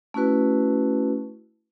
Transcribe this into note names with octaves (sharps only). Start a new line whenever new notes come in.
A3 C#4 E4 F#4 B4